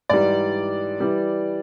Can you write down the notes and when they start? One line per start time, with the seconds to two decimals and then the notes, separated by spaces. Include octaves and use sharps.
0.09 G#2 E3 G3 D5
1.00 E3 G3